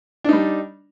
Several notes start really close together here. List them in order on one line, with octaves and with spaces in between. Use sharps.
D4 D#4 G3